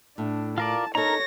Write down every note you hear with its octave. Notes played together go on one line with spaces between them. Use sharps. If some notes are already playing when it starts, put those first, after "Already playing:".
A2 D4
F4 A#4 D5 A5
D#4 A4 A#4 C#5 A#5 A#6